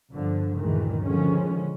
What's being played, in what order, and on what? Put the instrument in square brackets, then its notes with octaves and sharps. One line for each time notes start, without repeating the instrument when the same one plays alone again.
[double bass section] G1 G2 D3 F3
D2 G2 A#2 D#3 E3 G#3
D3 D#3 F3 G#3 C#4